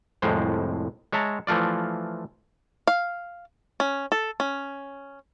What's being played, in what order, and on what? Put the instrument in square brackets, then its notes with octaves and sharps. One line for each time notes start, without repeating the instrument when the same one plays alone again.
[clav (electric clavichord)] C2 F2 A2 G#3 C5
G#3 C#5 E5 A5 A#5
E3 F3 A3 F4 D5
[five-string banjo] F5
C#4
A4
C#4